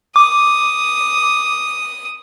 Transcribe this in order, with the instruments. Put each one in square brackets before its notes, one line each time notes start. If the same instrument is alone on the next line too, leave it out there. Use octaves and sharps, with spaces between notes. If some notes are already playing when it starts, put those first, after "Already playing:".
[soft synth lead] D6 [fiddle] D#6